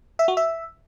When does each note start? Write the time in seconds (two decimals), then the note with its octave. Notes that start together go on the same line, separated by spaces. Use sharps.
0.19 E5
0.28 F#4
0.37 E5